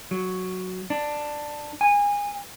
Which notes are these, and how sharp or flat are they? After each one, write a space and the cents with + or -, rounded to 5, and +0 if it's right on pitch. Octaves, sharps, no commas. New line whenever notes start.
F#3 +0
D4 +10
G#5 -25